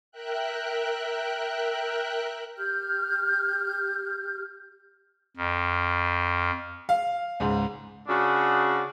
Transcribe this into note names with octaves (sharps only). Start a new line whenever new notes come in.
A#4 E5 G5 F#6
G4 F6 G6
F2
F5
C#2 G#2
C#3 D4 F#4